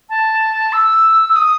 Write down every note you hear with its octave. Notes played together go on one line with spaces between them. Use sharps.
A5
E6
E6
D#6